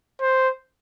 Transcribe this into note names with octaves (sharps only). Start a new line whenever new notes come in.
C5